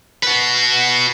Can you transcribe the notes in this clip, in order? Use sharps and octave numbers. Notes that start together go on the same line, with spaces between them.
F#4 B4